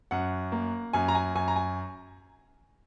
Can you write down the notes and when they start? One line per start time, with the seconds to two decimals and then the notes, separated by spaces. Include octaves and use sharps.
0.11 F#2 F#5
0.52 A#3
0.93 F#2 G#5
1.08 A#5
1.15 G#5
1.35 F#2 G#5
1.48 A#5
1.56 G#5